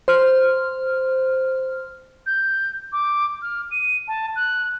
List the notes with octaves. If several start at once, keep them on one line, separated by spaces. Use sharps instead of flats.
C5 F6
G6
D6
F6
D#7
A5
F#6